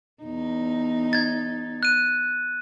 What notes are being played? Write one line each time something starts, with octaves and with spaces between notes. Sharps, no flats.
E2 D#4
G#6 A6
F#6 D#7